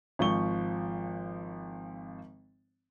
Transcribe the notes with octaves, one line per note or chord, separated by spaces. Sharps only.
G#1 F3 C#6 G7